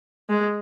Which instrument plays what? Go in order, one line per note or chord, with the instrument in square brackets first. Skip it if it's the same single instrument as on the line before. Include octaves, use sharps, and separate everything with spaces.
[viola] G#3